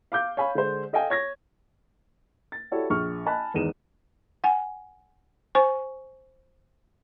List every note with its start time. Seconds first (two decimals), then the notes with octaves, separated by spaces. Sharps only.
0.12 F5 D6 G6
0.37 C#5 F5 G#5 B5
0.55 D3 G#3 C5
0.93 A4 D#5 F5 G5 G#5
1.10 C#5 G#6 A#6
2.52 A6
2.71 E4 F#4 G4 A4 C#5 D5
2.90 A#1 G#4 C#6 F6
3.26 D#5 G#5 A5 B5 F#6
3.54 G#1 E2 D#4 G#4 D#7 E7
4.44 F#5 G#5
5.55 C5 G#5 C#6